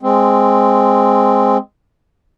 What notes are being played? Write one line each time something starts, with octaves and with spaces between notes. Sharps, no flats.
G#3 C4